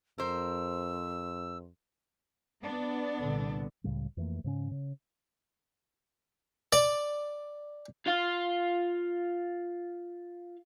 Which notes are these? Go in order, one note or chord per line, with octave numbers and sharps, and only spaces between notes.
F2 A#4 C5 E6
B3 D4
C2 A#2 D3
C#2 A2 C#3 G3
F2 E3 A3 A#3
G#2 C#3 C#4
C#3
D5
F4 F5